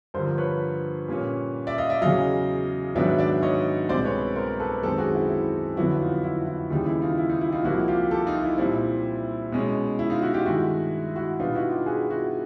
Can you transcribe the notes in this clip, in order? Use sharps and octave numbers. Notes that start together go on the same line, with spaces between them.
G2 D3 F3 A#4 C5
B4 C#5
A#2 G3 A#3 C#4
D5 E5
D#5 F5
D5 E5
E2 C#3 F#3 D#5 F5
G#2 D#3 F#3 B3 D4 D5 E5
D5 E5
C#5 D#5
C2 B2 G#3 C4 C5 D5
B4 C#5
A#4 C5
A4 B4
F#2 D#3 G#3 C4 G4 A4
F#4 G#4
E4 F#4
E4
F2 D3 F#3 B3 D4 E4 F#4
D#4 F4
E4
E4
D#2 C#3 E3 G3 D#4
E4
D#4 F4
E4
D#4
E4
D#4 F4
C2 C3 F3 A#3 E4 F#4
F4 G4
G4 A4
D#4 F4
E4
A#2 G3 C4 E4
B2 G#3 C#4
E4
D#4 F4
E4 F#4
F4 G4
G2 D#3 G#3 E4 F#4
E4 F#4
B2 G3 B3 D4 D#4 F4
E4 F#4
F4 G4
F#4 G#4
E4 F#4